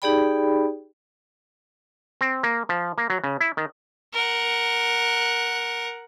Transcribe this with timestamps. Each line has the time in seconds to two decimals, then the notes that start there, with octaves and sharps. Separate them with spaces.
0.02 D#4 G4 G#4 D5 G5 B5
2.21 C4
2.43 A#3
2.69 F3
2.98 A#3
3.10 F#3
3.24 C#3
3.41 E4
3.57 D#3
4.14 A#4 F#5